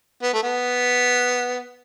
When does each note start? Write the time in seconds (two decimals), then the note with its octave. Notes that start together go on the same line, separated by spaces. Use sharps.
0.22 B3
0.33 A3
0.43 B3